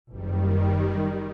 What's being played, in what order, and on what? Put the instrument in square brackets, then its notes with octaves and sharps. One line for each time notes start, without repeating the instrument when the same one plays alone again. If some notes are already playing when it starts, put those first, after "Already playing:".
[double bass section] F#1 [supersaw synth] D#3 G3